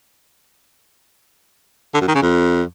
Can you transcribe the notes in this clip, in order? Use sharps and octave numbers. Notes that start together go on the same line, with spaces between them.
D3
F#2
D#3
C#3
F2